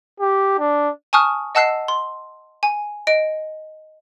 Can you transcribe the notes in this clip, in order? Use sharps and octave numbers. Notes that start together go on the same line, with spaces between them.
G4
D4
G#5 A5 C#6 D#6 F6 F#6
D#5 F#5 A5 E6 F#6 C7
C6
G#5
D#5 D7